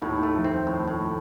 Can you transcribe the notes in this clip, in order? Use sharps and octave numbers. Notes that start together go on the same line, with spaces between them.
D#2 A2 D#3
A3
F2 F3
C4
A2
A2